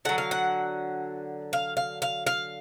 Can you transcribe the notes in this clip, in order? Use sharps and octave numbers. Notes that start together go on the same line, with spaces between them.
D3 F#3 F#5
F5
F#5
F5
F5
F5
F5